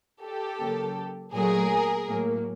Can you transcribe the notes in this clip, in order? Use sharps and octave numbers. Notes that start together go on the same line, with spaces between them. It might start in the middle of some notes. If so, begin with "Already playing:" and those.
G4 A4
C#3 F#3 A#3
A#2 F#3 A3 G#4 A#4
A2 F#3 A#3